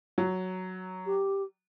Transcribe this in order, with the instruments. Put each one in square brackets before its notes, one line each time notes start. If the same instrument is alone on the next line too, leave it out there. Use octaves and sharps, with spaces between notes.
[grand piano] F#3
[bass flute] G4